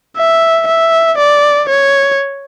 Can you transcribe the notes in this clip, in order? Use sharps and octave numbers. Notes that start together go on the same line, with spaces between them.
E5
E5
D5
C#5